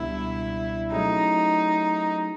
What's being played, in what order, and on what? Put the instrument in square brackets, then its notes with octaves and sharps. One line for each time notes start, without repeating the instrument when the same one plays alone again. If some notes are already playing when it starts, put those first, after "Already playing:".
Already playing: [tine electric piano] C#2 B2 G3 B3 D4 [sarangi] E4
[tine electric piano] F#3 A3 C#4 E4 G#4 [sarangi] D#4